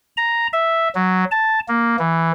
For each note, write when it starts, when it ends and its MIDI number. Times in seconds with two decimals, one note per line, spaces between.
0.17 0.47 82
0.53 0.89 76
0.95 1.25 54
1.31 1.60 81
1.68 1.96 58
1.99 2.32 52